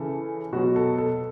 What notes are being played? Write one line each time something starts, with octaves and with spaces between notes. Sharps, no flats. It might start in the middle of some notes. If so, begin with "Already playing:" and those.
Already playing: C#3 E3 A4
B2 F#3 F#4
A4
A4